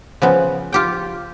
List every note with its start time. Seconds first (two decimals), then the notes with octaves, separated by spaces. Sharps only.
0.22 C#3 F3 B3
0.72 F4 G4 G5